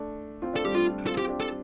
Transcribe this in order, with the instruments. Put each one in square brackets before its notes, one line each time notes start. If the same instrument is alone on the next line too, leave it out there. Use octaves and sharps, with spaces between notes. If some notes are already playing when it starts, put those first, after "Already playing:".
Already playing: [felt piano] A3 D4
C4 F4
[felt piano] A3 D4 [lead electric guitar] A4
[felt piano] G3 C4 [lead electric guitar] G4
[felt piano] A3 D4 [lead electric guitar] F4
[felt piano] C4 F4 [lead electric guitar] A4
[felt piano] C4 F4 [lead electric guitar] G4
[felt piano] D4 G4
[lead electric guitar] A4